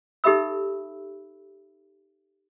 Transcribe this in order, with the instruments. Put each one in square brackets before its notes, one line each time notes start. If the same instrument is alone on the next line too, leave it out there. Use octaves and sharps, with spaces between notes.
[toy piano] D#4 G4 A4 E5 B5 E6